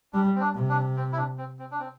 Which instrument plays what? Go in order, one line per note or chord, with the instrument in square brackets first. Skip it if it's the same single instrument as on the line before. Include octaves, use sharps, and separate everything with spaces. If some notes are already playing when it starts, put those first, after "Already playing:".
[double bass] G3 [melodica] D4
[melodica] C4
D4
[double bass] C3
[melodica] D4
C4
E4
D4
C4
C4
D4
C4